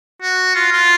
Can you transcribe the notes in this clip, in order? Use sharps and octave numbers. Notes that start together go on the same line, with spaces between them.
F#4
F4
F4